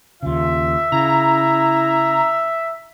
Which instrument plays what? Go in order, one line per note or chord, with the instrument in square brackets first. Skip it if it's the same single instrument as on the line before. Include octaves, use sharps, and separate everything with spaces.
[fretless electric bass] D#2 C#3 [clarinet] F4 [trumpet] E5
[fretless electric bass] C#3 [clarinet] E4 [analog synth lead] A#5